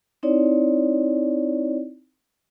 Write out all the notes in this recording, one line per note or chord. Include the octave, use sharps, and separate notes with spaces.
C4 D#4 E4 C#5 D5